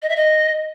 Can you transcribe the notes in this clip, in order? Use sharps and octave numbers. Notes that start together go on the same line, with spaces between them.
D#5
E5
D#5